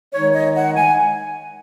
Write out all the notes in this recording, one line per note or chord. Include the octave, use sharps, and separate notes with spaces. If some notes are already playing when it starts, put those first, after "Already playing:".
D#3 G#3 D#4 C#5
D#5
F#5
G#5